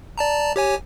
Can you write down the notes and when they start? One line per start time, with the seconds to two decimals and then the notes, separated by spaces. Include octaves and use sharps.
0.18 D5 A5 A#5
0.56 G4 C#5 G#5